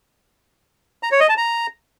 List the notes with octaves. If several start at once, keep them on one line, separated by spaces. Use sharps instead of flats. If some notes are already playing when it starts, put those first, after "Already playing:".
A#5
C#5
D#5
A5
A#5